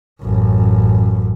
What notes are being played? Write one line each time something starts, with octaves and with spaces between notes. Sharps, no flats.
A1 F#2